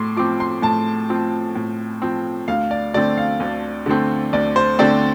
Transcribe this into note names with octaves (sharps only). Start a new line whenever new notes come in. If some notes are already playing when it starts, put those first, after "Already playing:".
Already playing: A2 C6 D6
F3 C4 D6
C6
A2 A5
F3 C4
A2
F3 C4
D2 F5
D5
D3 A3 C4 D5
F5
D2
D3 A3 C4
D2 D5
C5
D3 A3 C4 D5